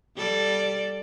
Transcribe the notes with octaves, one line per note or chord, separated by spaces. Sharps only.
G3 A4 D5